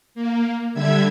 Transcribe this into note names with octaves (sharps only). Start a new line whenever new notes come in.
A#3
D3 G3 E5 G#6